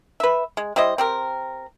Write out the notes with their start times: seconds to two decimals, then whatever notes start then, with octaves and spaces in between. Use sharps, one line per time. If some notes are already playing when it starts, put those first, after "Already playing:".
0.20 B4 E5
0.57 G#3
0.76 G3 E4 C5 D#5
0.98 C4 G4 A#4